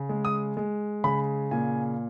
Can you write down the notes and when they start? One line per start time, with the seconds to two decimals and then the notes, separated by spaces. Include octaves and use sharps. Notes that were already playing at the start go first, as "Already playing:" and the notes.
Already playing: C#3
0.09 G#3
0.25 D#6
0.57 G#3
1.04 C#3 B5
1.51 A#2 G#5